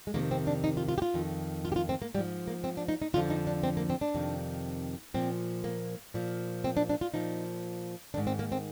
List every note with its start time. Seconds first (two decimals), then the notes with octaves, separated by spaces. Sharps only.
0.07 G#3
0.14 F2 C3 D#3 A#3
0.31 C4
0.47 D4
0.64 D#4
0.77 F4
0.88 F4
0.98 G4
1.02 F4
1.14 F2 D#3
1.65 F4
1.72 G4
1.76 F4
1.89 C4
2.02 A#3
2.14 G#2 G3
2.18 F3
2.48 A#3
2.64 C4
2.77 D4
2.88 D#4
3.02 D#4
3.13 F2 D3 F3 F4
3.30 D#4
3.47 D4
3.63 C4
3.77 A#3
3.90 C4
4.01 D4
4.15 F2 C3 D#3
5.14 A#2 F3 C4
5.64 A#3
6.14 A#2 F3
6.64 C4
6.77 D4
6.89 D4
7.01 F4
7.14 A#2 F3 D#4
8.14 D#3 D4
8.17 G#2
8.27 C4
8.39 A#3
8.52 C4